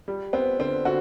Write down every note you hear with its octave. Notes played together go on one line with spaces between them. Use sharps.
G3
B3 C4
D3 C4
D3 F#4